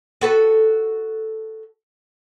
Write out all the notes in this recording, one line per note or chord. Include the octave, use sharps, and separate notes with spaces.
F#4 A4 B4